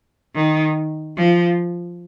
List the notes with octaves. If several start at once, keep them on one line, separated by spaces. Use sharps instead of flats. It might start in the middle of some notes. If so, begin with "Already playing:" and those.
D#3
F3